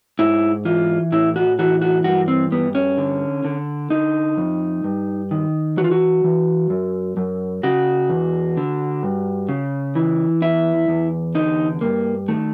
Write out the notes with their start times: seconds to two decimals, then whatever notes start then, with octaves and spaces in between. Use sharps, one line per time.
0.19 G#2 E4
0.65 E3 F4
1.12 A2 E4
1.36 F#4
1.59 E3 F#4
1.82 F#4
2.04 G2 F#4
2.28 C4
2.51 G2 B3
2.75 C#4
2.98 D3
3.45 D3
3.90 D3 D#4
4.38 F2
4.84 G2
5.31 D#3
5.77 E3 F#4
5.84 F4
5.91 F#4
6.24 E3
6.70 F#2
7.17 F#2
7.63 C#3 F#4
8.10 E2
8.57 D3
9.03 G2
9.49 C#3
9.95 E3
10.42 E2 E4
10.88 E2
11.35 D3 D#4
11.81 G2 A#3
12.28 D#3 A3